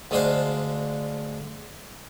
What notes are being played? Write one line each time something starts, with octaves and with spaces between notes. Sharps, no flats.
D2 G#3 D4 C5 F5